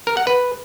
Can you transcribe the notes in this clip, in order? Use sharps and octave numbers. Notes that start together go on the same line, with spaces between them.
A#4
F#5
B4